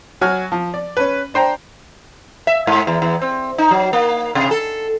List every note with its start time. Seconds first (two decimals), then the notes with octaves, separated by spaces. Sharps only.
0.21 F#3 F#4 G#5 F6
0.52 F3
0.74 D5
0.97 C#4 B4
1.34 D4 C5 G5 A#5
2.47 E5
2.67 G#2
2.87 E2
3.02 E2
3.22 C4
3.58 D#4
3.71 F#3
3.93 A#3
4.35 C3
4.51 A4